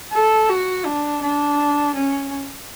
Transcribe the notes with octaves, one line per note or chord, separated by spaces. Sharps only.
A4
F#4
D4
D4
C#4